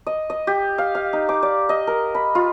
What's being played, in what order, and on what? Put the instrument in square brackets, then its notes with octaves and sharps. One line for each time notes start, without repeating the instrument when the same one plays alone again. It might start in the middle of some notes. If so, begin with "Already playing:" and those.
[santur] D#5
D#5
G4
F5
F5
D#4
D6
D5
D#5
A#4
B5
F4